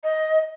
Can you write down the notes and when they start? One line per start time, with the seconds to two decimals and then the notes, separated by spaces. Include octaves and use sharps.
0.03 D#5